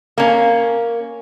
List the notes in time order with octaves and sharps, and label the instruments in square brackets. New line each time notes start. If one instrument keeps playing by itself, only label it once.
[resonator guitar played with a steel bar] A#3 C#4